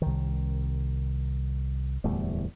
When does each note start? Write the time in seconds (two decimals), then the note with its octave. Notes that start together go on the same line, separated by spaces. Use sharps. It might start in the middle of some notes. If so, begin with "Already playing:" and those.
0.02 C2 D#3
2.04 D1 E2 G3 A3